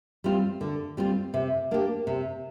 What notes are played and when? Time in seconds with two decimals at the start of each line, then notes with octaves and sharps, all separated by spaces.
0.24 G3 C4 F4
0.61 D3
0.97 G3 C4 F4
1.34 C3
1.71 A#3 D4 G4
2.07 C3